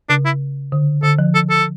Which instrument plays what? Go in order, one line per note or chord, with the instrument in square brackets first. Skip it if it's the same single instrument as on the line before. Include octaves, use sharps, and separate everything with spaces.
[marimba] C#3 [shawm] D4
[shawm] E4
[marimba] D3
[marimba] D3 [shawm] A4
[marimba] F3
[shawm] A4
A4